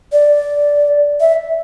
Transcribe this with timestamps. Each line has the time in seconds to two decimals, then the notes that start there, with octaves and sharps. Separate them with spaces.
0.12 D5
1.20 E5